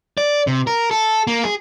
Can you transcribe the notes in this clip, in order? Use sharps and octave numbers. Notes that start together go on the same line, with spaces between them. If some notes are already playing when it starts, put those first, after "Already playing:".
D5
C3
A#4
A4
A#3
G#4